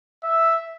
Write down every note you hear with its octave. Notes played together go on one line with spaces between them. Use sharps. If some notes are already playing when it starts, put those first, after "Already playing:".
E5